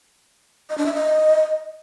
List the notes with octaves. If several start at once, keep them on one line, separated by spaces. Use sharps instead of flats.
D#5
D4
E5
D#5